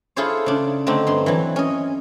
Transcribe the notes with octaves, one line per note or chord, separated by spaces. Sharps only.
E4 F4 G#4 A4 C5 C#5
C#3 D4
D3 A3 C4 D4 D#4
G2 C6
E3 F#3
C#4 D#5